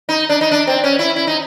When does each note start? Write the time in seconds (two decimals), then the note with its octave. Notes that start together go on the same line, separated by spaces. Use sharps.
0.09 D#4
0.29 D4
0.41 D#4
0.51 D4
0.67 C4
0.84 C#4
0.99 E4
1.16 E4
1.27 D#4